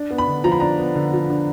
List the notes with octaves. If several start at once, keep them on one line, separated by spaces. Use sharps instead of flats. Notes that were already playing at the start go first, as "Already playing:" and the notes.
Already playing: D4
B3
B5
D3
F3 A#5
B5
D4 A#5
B3
D3
F3
D4